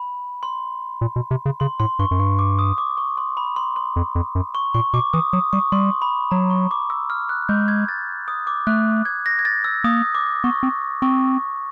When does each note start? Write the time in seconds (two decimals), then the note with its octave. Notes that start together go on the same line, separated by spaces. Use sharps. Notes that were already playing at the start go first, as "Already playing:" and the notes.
Already playing: B5
0.43 C6
1.01 A#2
1.16 B2
1.31 C3
1.46 C#3
1.60 C#3 C6
1.80 A2 C6
1.99 G2 C#6
2.11 F#2
2.19 G2 C#6
2.39 D6
2.59 D#6
2.78 D6
2.97 C#6
3.17 C6
3.37 B5
3.56 C6
3.76 C6
3.96 F2
4.15 F2
4.35 F#2
4.55 C#6
4.74 A#2 C#6
4.94 B2 D6
5.13 E3 D#6
5.33 F#3 D#6
5.53 G3 C#6
5.72 G3 C6
6.02 B5
6.31 F#3 A#5
6.50 C#6
6.71 D6
6.90 E6
7.10 F6
7.29 F#6
7.49 G#3 G6
7.68 G#6
7.88 A6
8.28 D#6
8.47 D6
8.67 A3 F#6
9.05 G#6
9.26 A#6
9.39 G#6
9.45 A6
9.64 E6
9.84 A#3 D#6
10.15 D6
10.44 B3 C#6
10.63 C4
11.02 C4 C#6